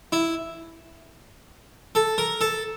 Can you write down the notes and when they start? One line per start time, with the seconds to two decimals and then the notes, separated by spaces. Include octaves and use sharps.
0.12 E4
1.95 A4
2.18 A#4
2.41 A4